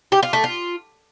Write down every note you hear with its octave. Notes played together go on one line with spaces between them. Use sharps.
G4
F4
A3
F4